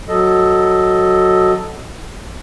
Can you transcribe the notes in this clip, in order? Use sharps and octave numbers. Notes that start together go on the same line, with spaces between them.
F#3 A4 D#5